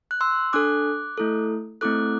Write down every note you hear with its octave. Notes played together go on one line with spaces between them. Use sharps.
F#6
C6 E6
D4 A4 D6 F#6
A3 E4 A4
A3 C4 E4 A4 D6 F#6